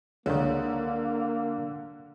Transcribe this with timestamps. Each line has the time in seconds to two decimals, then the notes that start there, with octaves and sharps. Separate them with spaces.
0.26 C#2 D3 D#3 A#3